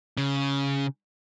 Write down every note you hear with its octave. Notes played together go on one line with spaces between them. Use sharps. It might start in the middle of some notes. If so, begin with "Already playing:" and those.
C#3